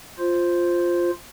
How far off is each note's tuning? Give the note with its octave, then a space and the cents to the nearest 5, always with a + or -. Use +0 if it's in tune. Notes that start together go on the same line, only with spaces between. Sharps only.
F4 +0 C5 +0